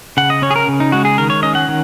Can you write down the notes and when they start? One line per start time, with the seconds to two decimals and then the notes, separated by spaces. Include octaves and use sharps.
0.17 C#3 F#5
0.30 D#5
0.42 C#4 C#5
0.50 G#4
0.56 A#4
0.68 C#3
0.80 D#4
0.92 G#3 F#4
1.05 G#4
1.18 D#3 A#4
1.30 C#5
1.43 C#4 D#5
1.55 F#5
1.68 D#3